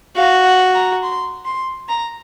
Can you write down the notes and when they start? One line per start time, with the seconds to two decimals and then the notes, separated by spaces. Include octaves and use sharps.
0.16 F#4 F5
0.45 F#5
0.74 A#5
1.02 C6
1.45 C6
1.88 A#5